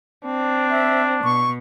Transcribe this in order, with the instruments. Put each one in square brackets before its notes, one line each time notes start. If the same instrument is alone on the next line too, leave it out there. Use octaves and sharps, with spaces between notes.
[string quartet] C4 [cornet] D4
[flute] E5
[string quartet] B2 [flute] C#6